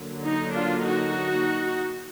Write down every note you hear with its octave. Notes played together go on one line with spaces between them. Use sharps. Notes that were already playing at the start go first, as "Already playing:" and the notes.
Already playing: D3 F#3 A#3
D#4
D4 F4
D#4 F#4